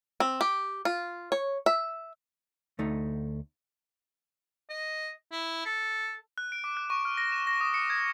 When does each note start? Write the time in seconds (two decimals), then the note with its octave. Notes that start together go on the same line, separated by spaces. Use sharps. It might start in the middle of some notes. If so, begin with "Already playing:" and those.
0.20 C4
0.41 G4
0.85 F4
1.32 C#5
1.66 E5
2.79 D2 A3 D#4
4.70 D#5
5.32 E4
5.66 A4
6.38 F#6
6.52 D7
6.64 D6
6.77 F#6
6.90 C#6
7.05 F6
7.17 A#6
7.32 E7
7.47 A#6
7.61 D#6
7.74 C#7
7.90 G#6